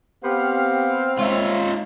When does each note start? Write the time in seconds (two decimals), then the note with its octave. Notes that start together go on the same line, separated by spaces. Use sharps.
0.24 B3 C4 G4 C5 F5
1.19 G#3 D#4 F4 C#5 E5